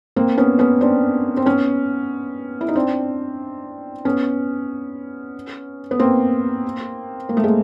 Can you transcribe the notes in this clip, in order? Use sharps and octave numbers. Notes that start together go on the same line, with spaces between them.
A#3 C4
B3 C#4
B3 C#4
C4 D4
C4
B3 C#4
E4
D#4
C4 D4
B3 C#4
B3
A#3 C4
A#3
A3
G#3 A#3